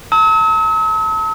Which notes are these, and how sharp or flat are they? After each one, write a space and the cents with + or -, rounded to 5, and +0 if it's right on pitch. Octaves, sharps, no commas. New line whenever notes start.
A5 +40 E6 -45